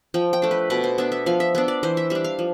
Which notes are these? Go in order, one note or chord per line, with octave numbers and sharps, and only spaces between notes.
F3 G5
G5
A3 D4
B4
B2 B4
C5
B3 D4 E5
E5
F3 F5
E5
B3 D4 E5
D5
E3 C5
E5
G3 D4 E5
F5
F3